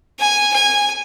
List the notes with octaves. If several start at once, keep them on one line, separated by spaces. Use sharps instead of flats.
G#5
G#5